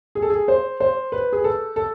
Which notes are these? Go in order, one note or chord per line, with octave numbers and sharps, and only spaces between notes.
G#4
A4
G#4
C5
C5
B4
G#4
A4
A4